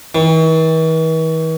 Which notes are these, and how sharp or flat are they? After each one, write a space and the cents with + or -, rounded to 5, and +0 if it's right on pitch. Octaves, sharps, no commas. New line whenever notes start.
E3 -45